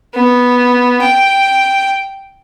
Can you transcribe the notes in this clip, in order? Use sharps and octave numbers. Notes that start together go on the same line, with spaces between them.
B3
G5